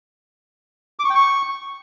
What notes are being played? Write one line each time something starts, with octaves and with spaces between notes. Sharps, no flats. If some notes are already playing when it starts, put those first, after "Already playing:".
D6
C#6
G5
C#6